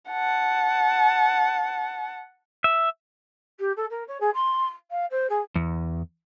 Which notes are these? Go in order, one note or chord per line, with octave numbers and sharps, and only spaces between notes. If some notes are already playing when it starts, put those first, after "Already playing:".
F#5 A5
E5
G4
A4
A#4
C#5
G#4
C6
F5
C5
G#4
E2